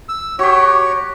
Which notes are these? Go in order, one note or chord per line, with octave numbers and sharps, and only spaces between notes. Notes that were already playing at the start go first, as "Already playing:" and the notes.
E6
F#4 G4 C#5